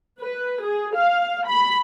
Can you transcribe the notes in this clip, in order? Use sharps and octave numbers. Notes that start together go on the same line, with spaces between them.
B4
G#4
F5
B5